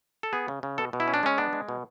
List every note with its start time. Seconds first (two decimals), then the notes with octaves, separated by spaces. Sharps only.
0.23 A4
0.33 B3 G#4
0.48 C#3
0.63 C#3
0.78 B2 A4
0.93 B2
1.00 E4
1.08 C#4
1.14 D4
1.23 G#3 C#4
1.38 B3 D4
1.53 G#3
1.69 B2